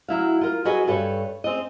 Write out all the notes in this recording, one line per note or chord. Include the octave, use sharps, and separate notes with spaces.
F#3 E4 F5
F4 A#4
F#3 F#4 G#4 B4 D#5
G2 A4 B4 C#5
C4 G#4 D#5